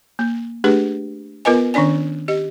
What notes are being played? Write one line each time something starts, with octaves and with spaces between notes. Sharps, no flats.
A#3
A3 D4 G4 G#4 B4
B3 F4 A#4 B4 D#5 G#5
D#3 C#4 D4 D5 G#5
G4 D#5